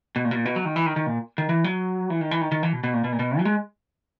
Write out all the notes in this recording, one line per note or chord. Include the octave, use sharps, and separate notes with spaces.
B2
A#2
B2
A#2
B2
F#3
D#3
E3
D#3
D#3
A#2
D#3
E3
F#3
E3
D#3
E3
D#3
D#3
E3
B2
B2
A#2
B2
A#2
B2
F#3
G#3